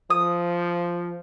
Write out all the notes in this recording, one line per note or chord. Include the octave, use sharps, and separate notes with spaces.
F3 D#6